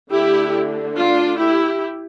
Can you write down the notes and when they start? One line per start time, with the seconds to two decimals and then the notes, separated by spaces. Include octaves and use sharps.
0.11 D3 A3 D4 E4 G4
0.95 D4 F4
1.37 E4 G4